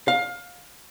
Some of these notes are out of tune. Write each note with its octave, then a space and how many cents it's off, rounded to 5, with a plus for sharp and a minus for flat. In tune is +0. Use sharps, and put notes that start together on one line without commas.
F5 +25